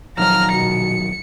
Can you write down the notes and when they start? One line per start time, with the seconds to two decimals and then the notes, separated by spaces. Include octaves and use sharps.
0.18 A#1 D#3 F3 F#3 A#5 F6
0.52 B2 C#7